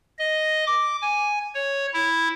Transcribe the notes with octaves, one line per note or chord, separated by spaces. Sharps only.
D#5
D6
G#5
C#5
E4